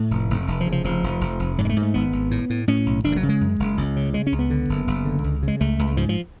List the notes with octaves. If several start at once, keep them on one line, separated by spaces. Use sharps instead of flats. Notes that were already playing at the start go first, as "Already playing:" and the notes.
Already playing: A2 A3
F1
F1
F1
F3
C#3
F3
F1 F3
F1
F1
F1
G#2 F#3
G#3
A3
G#2
A3
G#1 B3
G#1
A2
A2
A2 C#4
B1
F#1 D4
F3
F#3
C#3
G#3
F#2
F#1
C#2
C#3
C#3 G#3
C#4
C#2
B3
D3
F#1
F#1
D3
C#2
C#3 G#3
C#2 A3
C#2
G#2 F3
F3